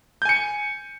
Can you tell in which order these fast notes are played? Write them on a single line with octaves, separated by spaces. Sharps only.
G6 G#5 C#7